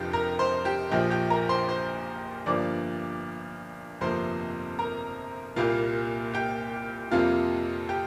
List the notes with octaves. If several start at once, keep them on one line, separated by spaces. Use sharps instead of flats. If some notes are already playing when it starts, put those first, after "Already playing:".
Already playing: F1 F2 F3 D4 F4 G4 G5
A#4 A#5
C5 C6
G4 G5
A#1 A#2 F3 G4 G5
G4 G5
A#4 A#5
C5 C6
C5 C6
G1 G2 F3 A#3 D5 D6
G1 F2 C3 F3 A#3 C5 C6
A#4 A#5
C2 A#2 G3 A#3 F4 F5
G4 G5
F2 C3 G3 A#3 F4 F5
G4 G5